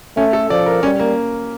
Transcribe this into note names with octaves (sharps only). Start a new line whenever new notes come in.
A3 C#4
A4
F3 D5
A#4
G3 C#4
A#3